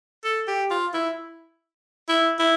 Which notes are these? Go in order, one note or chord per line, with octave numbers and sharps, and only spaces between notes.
A4
G4
F4
E4
E4
E4